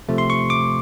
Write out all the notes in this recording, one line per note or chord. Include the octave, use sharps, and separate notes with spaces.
C3 F3 A3
C6
C#6
D6